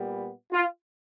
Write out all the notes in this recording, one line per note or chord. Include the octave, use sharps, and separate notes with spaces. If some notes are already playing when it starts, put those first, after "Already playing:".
Already playing: A#2 G3 B3
F4